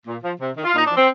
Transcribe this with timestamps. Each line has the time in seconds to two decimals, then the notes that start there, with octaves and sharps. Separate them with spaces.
0.06 A#2
0.22 F3
0.40 C3
0.56 D#3
0.65 F4
0.73 A#2 D#4
0.87 F3 D4
0.97 C4